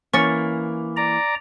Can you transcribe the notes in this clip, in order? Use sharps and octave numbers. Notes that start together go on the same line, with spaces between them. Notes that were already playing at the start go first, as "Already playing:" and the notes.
E3 A#3 C#4 C#6 A6 C#7
D5 A#5